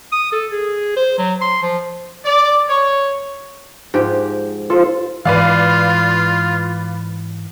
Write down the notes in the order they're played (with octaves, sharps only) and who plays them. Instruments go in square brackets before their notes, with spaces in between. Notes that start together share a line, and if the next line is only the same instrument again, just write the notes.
[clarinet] D#6
A4
G#4
C5
F#3
C6
F3
[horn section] D5
C#5
[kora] G#2 F3 G4
[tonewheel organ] F4 C5 [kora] A4
[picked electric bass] G#2 E3 [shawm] F4 [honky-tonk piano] B4 D5 F5